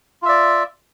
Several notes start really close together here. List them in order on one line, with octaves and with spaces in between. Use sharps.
F4 E5 D5